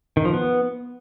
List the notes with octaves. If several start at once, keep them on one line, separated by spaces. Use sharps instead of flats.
D#3
F3
B3